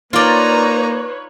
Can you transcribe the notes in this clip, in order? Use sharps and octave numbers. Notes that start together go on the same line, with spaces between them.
A#3 D#4 F4 B4 C#5 D5 A#5